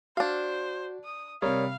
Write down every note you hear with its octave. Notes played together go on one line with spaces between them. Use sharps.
D4 F#4 C5 F5
D#6
C3 G3 A#4 C#5 F5 D#6